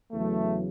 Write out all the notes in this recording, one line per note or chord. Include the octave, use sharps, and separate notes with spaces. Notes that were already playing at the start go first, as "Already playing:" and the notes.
E2 C#3 F#3 A3